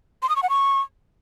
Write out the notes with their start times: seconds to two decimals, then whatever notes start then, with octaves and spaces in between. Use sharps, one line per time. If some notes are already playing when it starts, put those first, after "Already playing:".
0.23 C6
0.29 D#6
0.36 C#6
0.43 F#5
0.50 C#6